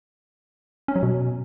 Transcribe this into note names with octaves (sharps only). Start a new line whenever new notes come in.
C#4
F#3
B2